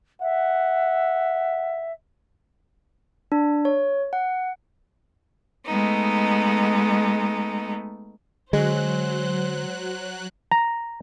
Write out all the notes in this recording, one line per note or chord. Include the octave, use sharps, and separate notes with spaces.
E5 F#5
D4
C#5
F#5
G#3 A3 B3 D#4
D3 F#3 G#3 C5 F#6
A#5